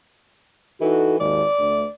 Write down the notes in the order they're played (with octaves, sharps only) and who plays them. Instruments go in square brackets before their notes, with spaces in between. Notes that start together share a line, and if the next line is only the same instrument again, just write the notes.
[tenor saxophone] E3 [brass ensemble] D#4 F#4 A4
[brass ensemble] G#1 D#2 [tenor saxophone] D5
[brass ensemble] D2